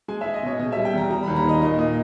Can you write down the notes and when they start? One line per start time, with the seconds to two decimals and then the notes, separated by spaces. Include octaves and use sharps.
0.08 G#3 G#5
0.21 E5
0.26 G#3
0.34 D#5
0.43 B2 C#5
0.59 B2 D#5
0.72 E5
0.76 G3
0.85 G5
0.93 E2 A#5
1.10 G3 A#5
1.23 B5
1.27 D#2
1.36 A#5
1.44 D#3 D#5
1.61 A#2 D#5
1.79 A#2 D#5